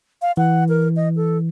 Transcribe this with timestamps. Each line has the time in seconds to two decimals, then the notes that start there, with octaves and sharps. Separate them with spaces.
0.22 F5
0.37 E3 F#5
0.69 A#4
0.96 D#5
1.16 A4